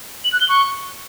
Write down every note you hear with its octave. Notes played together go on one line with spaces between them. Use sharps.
F#7
F#6
G7
C#6